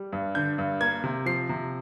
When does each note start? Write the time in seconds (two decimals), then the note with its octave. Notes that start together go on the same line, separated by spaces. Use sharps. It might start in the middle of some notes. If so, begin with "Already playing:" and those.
Already playing: G3
0.13 G2
0.35 D3 G6
0.58 G2
0.81 A#3 G#6
1.04 C3
1.26 F3 C7
1.49 C3